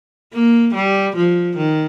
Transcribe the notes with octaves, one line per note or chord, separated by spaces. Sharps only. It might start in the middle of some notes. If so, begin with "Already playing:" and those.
A#3
G3
F3
D#3